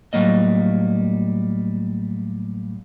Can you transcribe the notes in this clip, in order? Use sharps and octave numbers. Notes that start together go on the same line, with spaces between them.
A2 F#3 G3 A#3 D#5